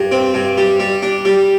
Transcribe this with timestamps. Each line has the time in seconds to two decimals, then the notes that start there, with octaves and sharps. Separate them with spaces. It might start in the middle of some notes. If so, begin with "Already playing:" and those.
Already playing: G2
0.12 C4
0.34 G2
0.57 G3
0.80 G3
1.02 D4
1.25 G3